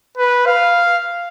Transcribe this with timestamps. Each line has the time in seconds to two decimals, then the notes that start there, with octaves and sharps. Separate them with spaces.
0.18 B4
0.46 F5